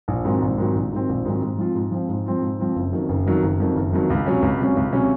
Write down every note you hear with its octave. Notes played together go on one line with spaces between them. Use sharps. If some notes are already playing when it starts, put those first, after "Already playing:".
A#1
G#2 D#3 F#3 C4
A#1
G#2 D#3 F#3 C4
A#1
G#2 D#3 F#3 C4
A#1
G#2 D#3 F#3 C4
G#2
F3 C4 F4
G#2
F3 C4 F4
G#2
F3 C4 F4
G#2
F3 C4 F4
F#1
F2 D#3 F#3
F#1
F2 D#3 F#3
F#1
F2 D#3 F#3
F#1
F2 D#3 F#3
C#2
C3 F#3 C#4
C#2
C3 F#3 C#4
C#2
C3 F#3 C#4